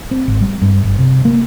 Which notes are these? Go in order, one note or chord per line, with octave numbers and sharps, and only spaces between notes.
C4
G#1
G3
G2
G1
C3
A#3